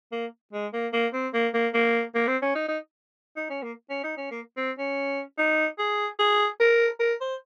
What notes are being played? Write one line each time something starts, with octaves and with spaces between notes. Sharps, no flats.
A#3
G#3
A#3
A#3
C4
A#3
A#3
A#3
A#3
C4
C#4
D#4
D#4
D#4
C#4
A#3
C#4
D#4
C#4
A#3
C4
C#4
D#4
G#4
G#4
A#4
A#4
C5